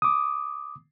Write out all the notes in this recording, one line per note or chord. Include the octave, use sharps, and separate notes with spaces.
D6 D#6